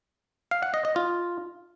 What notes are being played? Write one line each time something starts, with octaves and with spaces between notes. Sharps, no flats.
F5
F#5
D#5
D#5
F4